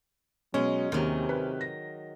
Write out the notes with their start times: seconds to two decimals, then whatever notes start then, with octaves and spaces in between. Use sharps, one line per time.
0.54 B2 F#3 G#3 C#4
0.92 D#2 C3 D#3 F#3
1.29 B4
1.61 A#6